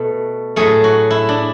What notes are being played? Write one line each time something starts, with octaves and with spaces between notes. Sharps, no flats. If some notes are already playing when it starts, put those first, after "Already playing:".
Already playing: B2 A3
A2 F#3 A3 G#4
F#4
E4
D4